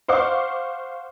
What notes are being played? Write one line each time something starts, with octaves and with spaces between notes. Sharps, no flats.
C5 F5 F#5 C#6 D6